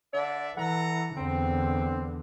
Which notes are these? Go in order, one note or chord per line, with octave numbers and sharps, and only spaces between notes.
D3 D5 E5
E3 A4 F#5 A#5
E2 D3 C4